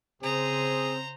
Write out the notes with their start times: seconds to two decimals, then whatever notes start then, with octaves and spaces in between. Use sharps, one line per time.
0.23 C#3 C4 G#4 C5 A#5